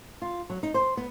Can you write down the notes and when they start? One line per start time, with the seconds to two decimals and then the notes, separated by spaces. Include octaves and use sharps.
0.22 F4
0.50 F#3
0.63 D#4
0.74 C5
0.97 B3